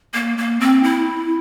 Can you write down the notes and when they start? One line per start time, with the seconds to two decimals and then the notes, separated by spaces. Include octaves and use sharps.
0.14 A#3
0.38 A#3
0.60 C4
0.83 E4